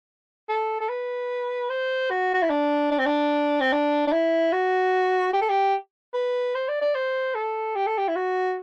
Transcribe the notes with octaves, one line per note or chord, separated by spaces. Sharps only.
A4
A4
B4
C5
F#4
F#4
E4
D4
D4
C4
D4
C4
D4
D4
E4
F#4
G4
A4
G4
B4
C5
D5
D5
C5
A4
G4
A4
G4
E4
F#4